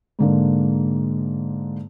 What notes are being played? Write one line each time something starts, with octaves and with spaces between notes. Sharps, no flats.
G#2 D3 A#3